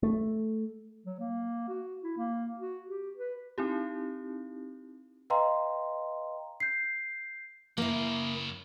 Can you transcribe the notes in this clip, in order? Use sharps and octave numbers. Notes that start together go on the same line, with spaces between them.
A3
F#3
A#3
F#4
E4
A#3
F#4
G4
B4
C4 D#4 E4 G4
B4 D#5 F5 G5 A#5 C6
G6 C7
F#2 C#3 A#3 E4